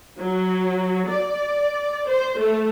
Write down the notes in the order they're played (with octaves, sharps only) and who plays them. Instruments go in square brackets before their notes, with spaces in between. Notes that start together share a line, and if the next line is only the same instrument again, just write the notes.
[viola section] F#3
D5
C5
A3